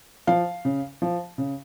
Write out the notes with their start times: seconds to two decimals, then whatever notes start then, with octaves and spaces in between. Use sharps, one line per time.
0.27 F3 F5
0.65 C#3
1.02 F3
1.38 C#3